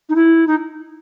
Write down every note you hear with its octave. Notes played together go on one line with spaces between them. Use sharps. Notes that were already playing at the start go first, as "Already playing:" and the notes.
D#4
E4
D#4